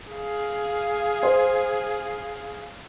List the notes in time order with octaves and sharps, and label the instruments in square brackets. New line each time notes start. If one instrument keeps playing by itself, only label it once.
[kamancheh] G#4 F5
[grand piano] C5